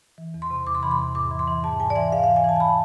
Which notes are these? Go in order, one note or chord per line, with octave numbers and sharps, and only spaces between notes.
E3
E2
C6
C3
E2 D6
C6
E3 B5
C6
E2
G#2 D6
E3
C6
E3
G#2 A5
G#2 G#5
D5
E3 E5
G#2 F5
F5
E3
G#5
E3 A5
A5
B5